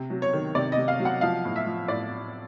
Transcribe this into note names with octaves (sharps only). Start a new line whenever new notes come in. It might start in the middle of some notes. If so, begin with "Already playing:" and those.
Already playing: C3
F#3
C#5
D#3
C3 D5
D#5
C3
F5
F#3
F#5
F3 F5
A2
E5
F3
A2 D5